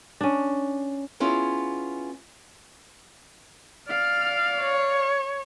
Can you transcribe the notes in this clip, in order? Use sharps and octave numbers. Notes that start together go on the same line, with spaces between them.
C#4 D4
B3 C#4 E4 F4 G#4
D5 F5 F6
C#5